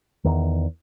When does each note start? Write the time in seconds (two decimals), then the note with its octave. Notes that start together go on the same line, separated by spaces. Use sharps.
0.24 E2 D#3